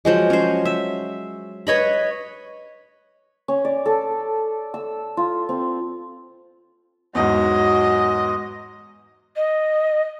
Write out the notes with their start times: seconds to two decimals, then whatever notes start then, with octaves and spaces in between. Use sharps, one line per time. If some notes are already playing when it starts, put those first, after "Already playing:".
0.05 F3 F#3 G#3
0.30 C#4 C5
0.65 E5
1.67 B4 C#5 D#5 B5
3.48 C#4
3.65 D5
3.86 A4
4.74 E6
5.17 F4
5.49 C4
7.15 E2 G#2 F#3 D#5
9.35 D#5